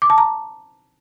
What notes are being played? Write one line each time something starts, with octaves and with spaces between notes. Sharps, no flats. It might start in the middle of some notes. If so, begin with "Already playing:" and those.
D6
A5
A#5